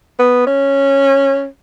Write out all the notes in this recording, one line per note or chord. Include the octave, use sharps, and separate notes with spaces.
B3
C#4